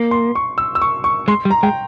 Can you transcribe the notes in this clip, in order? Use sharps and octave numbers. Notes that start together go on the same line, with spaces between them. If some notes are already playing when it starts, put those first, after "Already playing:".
Already playing: A#3
C6
C#6
E6
E6
C#6
C#6
G#3 C6
G3
A#5
G#3 G5